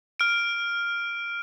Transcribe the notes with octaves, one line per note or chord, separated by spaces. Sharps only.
F6 D7